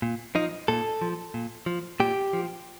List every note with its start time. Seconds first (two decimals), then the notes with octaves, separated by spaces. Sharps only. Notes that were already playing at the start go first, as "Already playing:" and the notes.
0.02 A#2
0.35 F3 D#4
0.68 A#2 A4
1.02 F3
1.34 A#2
1.66 F3
2.00 A#2 G4
2.33 F3